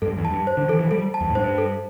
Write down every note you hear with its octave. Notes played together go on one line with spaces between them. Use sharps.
G2 A4
E2
A5
G2
C5
D3
E3 A4
E3
G3 A4
A5
E2
A2
G2 C5
A4